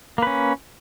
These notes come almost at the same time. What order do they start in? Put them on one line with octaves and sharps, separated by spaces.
A#3 B4 C#4